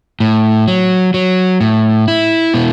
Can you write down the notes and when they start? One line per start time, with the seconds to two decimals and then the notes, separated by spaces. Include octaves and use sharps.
0.20 A2
0.68 F#3
1.14 F#3
1.61 A2
2.08 E4
2.54 B2